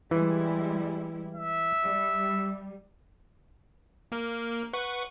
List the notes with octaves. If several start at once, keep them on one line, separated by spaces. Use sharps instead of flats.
E3 G3 G#3 E4
E5
G3
A#3 A#4
B4 F#5 C#6